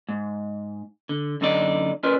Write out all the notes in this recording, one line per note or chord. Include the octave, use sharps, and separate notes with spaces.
G#2
D3
F#2 D3 D#4 E4 D5
C#4 F4 A#4 B4 D5